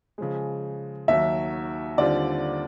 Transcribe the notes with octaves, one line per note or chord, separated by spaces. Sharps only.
C#3 F3 G#3
D#2 D#3 F#3 E5
D#2 D3 G3 C4 F4 D5